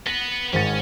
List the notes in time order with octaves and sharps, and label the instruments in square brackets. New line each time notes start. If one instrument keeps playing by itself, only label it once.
[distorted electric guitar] B3 B4 [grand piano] A#6
[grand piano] G#1 G#2 A6 [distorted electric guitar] C#4